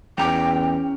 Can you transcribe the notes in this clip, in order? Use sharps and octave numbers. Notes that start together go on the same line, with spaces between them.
E2 C#4 G5 A#5